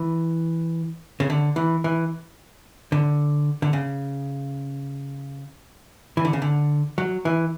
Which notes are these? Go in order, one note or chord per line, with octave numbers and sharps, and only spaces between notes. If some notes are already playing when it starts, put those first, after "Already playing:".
Already playing: E3
C#3
D3
E3
E3
D3
D3
C#3
E3
D3
C#3
D3
F#3
E3